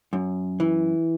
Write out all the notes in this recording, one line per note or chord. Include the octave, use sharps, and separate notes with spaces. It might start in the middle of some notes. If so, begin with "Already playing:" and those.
F#2
E3